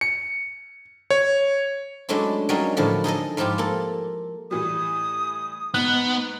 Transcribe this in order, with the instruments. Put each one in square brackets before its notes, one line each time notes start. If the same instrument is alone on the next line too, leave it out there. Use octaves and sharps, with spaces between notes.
[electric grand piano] C#7
C#5
[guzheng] F#3 G#3 A3 C#4 D4 E4
F#3 G3 C#4 D#4 A#4 F5
A2 D3 F3 F#3 E4
D#4 G#4 A4 D#5
G#2 F3 E4 F4 G4
A#3 A4
[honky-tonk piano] A2 E3 G3 [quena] D#6
[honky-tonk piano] G#2 [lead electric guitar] B3 [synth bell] F#6